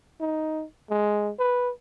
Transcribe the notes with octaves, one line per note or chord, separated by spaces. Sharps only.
D#4
G#3
B4